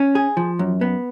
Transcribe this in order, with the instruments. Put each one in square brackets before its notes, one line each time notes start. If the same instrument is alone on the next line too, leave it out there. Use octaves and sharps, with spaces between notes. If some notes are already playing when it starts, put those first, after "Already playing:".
Already playing: [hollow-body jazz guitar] C#4
G#4
F3
F#2
B3